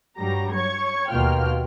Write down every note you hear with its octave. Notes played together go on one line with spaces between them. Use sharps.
G2 F#3 G3 A#5 A#6
C#5 C#6 G#6
D#2 B2 A#3 F4 G5 F6